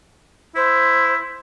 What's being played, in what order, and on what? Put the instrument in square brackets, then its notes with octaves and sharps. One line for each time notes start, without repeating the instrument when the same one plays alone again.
[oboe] E4 [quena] C5